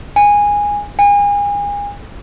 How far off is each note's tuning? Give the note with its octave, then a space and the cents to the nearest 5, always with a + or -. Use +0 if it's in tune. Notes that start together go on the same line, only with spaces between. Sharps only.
G#5 -15
G#5 -35